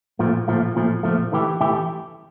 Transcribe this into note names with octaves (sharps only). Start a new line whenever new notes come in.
A#2 F3 A3
A#2 F3 A3
A#2 F3 A3
A#2 F3 A3
E3 A3 E4 G4
E3 A3 E4 G4